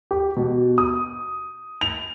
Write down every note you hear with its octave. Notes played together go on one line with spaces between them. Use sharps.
G4
B2
D#6
F7